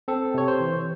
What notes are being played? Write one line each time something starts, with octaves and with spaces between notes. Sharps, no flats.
C4 A4
C3 C#5
C5
E3